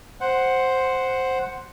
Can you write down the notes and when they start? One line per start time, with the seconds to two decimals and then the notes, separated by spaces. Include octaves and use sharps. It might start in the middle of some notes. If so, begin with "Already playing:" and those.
0.21 C5 F#5